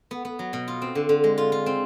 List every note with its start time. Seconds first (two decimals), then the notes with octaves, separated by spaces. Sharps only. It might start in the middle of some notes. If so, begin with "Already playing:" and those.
0.11 B3
0.25 B3
0.39 F#3
0.53 B2
0.68 F4
0.82 C4
0.95 D3
1.09 D3
1.24 G#3
1.38 F4
1.52 F4
1.66 C4